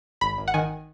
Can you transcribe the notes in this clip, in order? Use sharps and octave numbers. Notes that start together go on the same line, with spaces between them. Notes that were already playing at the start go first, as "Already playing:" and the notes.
G#1 B5
G#1
F#5
D#3 G#5